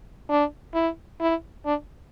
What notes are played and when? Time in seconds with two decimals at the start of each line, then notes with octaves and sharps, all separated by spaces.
0.30 D4
0.75 E4
1.20 E4
1.66 D4